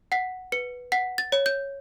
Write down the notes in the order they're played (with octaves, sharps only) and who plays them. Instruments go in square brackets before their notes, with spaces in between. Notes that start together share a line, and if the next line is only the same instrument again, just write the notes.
[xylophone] F#5 B6
B4 C#7
F#5 B6
A6
C#5
G6